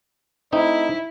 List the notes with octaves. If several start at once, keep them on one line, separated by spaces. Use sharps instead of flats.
A3 C4 D#4 E4